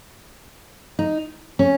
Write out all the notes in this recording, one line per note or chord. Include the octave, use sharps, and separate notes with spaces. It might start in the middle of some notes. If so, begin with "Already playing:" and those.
D#4
C#4